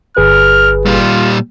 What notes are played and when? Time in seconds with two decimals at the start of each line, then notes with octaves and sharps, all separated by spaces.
0.17 G1 G#4 B4 F6
0.86 A#2 G3 F4